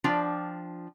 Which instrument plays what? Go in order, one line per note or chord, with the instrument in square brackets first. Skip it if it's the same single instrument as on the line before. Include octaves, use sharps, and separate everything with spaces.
[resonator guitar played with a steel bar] F3 D4 F4 G5